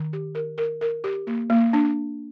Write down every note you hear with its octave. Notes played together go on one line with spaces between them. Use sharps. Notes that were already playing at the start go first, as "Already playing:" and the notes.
Already playing: D#3
G4
A#4
A#4
A#4
G4
A#3
A#3
D4